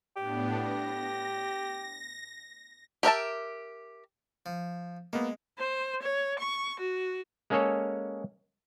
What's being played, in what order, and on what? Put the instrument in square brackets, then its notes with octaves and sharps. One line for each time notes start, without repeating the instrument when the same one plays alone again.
[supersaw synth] A2 B3 D4 [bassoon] G4
[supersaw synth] A#6
[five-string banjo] G4 A#4 E5 A5
[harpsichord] F3
[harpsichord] G#3 [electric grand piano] A#3 B3
[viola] C5
C#5
C#6
F#4
[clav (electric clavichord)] G#3 A#3 C#4 G#4 A4 C#5